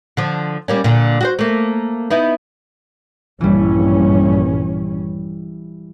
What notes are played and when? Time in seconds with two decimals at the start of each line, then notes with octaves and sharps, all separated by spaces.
0.17 D3 F3
0.68 G3 A#3 C#4
0.84 A#2 D3
1.21 F#4 G4 C5
1.39 A3 A#3
2.10 B3 D#4 E4
3.41 A#1 G2 E3 G3 C#4